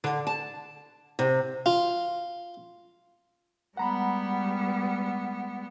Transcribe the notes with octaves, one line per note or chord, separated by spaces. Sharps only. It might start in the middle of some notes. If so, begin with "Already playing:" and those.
D3
A5
C3
F4
G3 G#3 B3 F#5 A#5 B5